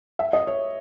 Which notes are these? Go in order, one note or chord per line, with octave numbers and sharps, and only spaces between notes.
E5
D#5
C#5